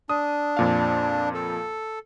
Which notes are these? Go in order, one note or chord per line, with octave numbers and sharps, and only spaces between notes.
D4 D#6
F2 A#2 F5
A4